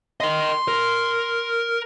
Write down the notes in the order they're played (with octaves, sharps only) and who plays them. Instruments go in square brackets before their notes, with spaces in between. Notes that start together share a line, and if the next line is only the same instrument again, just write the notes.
[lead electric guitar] A#4 D#5 [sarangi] C6
[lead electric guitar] A#4